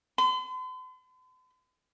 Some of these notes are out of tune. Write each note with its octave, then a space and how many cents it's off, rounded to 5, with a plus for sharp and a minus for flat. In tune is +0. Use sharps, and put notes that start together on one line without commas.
C6 -45